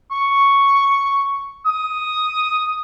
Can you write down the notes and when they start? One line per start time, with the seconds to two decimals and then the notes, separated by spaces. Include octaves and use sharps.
0.11 C#6
1.65 D#6